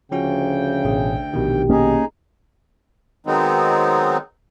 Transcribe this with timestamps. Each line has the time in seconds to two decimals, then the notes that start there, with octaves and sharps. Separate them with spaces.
0.12 D2 C#3 F3 C#4 F#4 G5
0.85 A1 B2 G#4
1.33 A#1 B2 D#3 G4
1.69 A#3 C#4 D#4 G#4
3.26 D#3 F#3 G#3 B3 C4 D#4